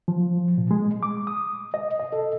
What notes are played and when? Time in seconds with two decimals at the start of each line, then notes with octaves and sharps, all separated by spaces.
0.08 F3
0.58 A#2
0.71 G#3
1.03 D6
1.27 D#6
1.74 D#5
2.00 D#5
2.12 A4